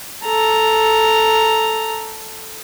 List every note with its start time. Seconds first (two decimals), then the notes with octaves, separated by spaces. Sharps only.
0.24 A4 A#5